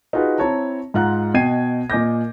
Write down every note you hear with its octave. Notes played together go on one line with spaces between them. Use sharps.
D#4 F4 F#4 G#4 B4
C4 E4 C#5 A5 A#5
G#2 F4 F#5 A#5 F#6
B2 D#5 G5 G#6 C7 D#7
A#2 D#5 G#5 D6 G6 A#6